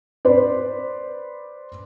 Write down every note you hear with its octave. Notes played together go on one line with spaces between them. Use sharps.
B4 C5 D5